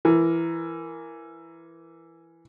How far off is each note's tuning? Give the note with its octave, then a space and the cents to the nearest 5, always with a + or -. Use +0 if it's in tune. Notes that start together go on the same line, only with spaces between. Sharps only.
E3 +15 A#4 +0